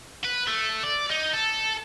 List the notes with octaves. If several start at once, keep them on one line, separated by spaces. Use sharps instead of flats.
B4
A3
D5
D#4
A4